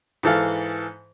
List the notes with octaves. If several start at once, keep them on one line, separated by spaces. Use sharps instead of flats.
G#2 E3 A4 F5